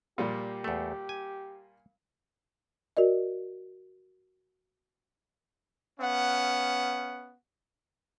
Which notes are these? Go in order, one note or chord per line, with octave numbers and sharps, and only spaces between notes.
A#2 G3 A#3 G4
E2 A3
G#5
F#4 A#4 D5 D#5
B3 C#4 F5 F#5